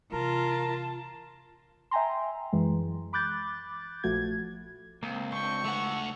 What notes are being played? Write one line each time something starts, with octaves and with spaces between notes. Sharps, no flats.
C3 E3 F4 A#4 A5
E5 G5 G#5 A#5 C6
F#2 E3 G#3
B5 D6 F#6 G6 A6
A#1 F3 A3 F#4 G#6
C#2 A#3 C4
C4 D4 G5 C#6
A3 F#5 E6